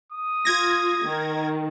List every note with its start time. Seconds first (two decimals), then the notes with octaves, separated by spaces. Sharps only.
0.12 D#6
0.45 F4 G#6 A#6
1.05 D#3